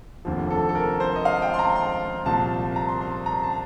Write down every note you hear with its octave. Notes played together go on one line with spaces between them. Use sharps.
F1 D#2 D3 F3
A4
A4
A#4
C5
D#5
F5
G5
C6
A#5
C6
C2 A#2 F3 A5
A#5
C6
C6
A#5
A5